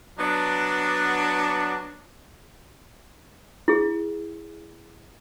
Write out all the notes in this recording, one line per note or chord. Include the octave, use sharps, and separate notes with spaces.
F#3 B3 D4
E4 G#4